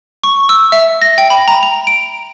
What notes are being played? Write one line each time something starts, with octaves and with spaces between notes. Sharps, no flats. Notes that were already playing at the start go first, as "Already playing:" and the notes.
C#6
E6
E5
A#6
G5
B5
A#5
F7
D7